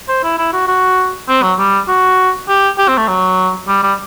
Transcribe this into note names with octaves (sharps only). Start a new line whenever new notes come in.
C5
E4
E4
F#4
F#4
C4
F#3
G3
F#4
G4
G4
C4
A3
F#3
G3
G3